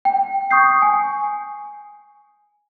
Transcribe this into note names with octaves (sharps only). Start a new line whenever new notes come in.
G5
C#6 D#6 G6 C7
G#5